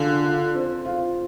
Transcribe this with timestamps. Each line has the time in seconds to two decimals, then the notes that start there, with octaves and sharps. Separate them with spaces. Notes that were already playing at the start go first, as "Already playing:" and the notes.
Already playing: D3 F4 G#4
0.24 F4
0.55 C4
0.85 F4